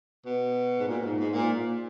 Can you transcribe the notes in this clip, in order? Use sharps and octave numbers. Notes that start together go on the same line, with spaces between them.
B2
G#2
A#2
G#2
G#2
A#2